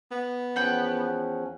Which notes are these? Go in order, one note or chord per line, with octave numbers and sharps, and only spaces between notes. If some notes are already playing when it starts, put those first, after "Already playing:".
B3
E2 F3 C#4 F#5 G5 B5